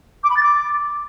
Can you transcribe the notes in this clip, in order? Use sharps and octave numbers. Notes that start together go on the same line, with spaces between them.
D6
B5
A6
D6